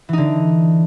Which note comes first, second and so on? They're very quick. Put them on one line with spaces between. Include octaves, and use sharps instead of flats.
E3 D#4 D3